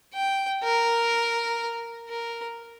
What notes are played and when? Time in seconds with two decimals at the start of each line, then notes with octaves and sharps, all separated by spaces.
0.14 G5
0.63 A#4
2.09 A#4